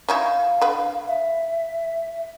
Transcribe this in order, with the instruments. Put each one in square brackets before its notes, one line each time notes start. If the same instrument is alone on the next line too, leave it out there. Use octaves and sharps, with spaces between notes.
[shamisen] C#4 D#4 E4 [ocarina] F5
[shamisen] D3 B4
[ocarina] E5